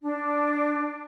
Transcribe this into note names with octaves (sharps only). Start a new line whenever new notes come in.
D4